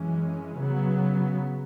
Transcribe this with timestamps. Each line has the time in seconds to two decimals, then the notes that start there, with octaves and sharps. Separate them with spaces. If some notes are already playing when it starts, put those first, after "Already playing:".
Already playing: F#2 E3 G#3 C#4
0.58 C#3 F#3 B3